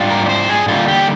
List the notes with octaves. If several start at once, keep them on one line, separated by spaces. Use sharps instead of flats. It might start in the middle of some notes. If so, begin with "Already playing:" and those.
Already playing: G#2 G3 D4 F4
A#4
D5
C5
G#4
D3 G3 A#3 D#4 F4
G4